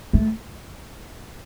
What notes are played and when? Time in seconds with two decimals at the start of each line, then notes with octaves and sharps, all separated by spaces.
0.13 A3